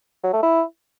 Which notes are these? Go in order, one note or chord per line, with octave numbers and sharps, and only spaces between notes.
F#3
A3
E4